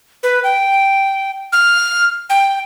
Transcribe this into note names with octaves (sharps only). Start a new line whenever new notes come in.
B4
G5
F6
G5